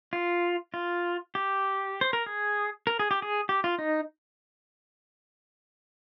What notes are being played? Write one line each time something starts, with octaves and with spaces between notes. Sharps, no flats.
F4
F4
G4
C5
A#4
G#4
A#4
G#4
G4
G#4
G4
F4
D#4